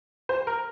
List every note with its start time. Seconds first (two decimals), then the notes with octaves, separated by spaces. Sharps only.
0.29 C5
0.47 A#4